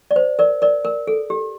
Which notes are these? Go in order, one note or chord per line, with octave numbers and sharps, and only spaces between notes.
D5
C5
A#4 D5
A#4 D5
A#4
A4
G4